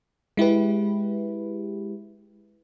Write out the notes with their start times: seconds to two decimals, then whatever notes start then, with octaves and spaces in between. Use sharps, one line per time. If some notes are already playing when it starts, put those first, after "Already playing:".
0.37 G#3 E4 G4 B4